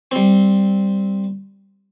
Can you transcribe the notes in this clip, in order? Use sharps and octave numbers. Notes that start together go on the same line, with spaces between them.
G3 C4